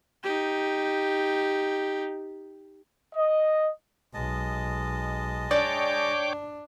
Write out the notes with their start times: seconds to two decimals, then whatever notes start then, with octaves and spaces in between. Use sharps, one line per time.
0.24 D#4 G4
3.15 D#5
4.14 B1 G#3 D#5 A5
5.51 D4 C#5 D5 G5 D6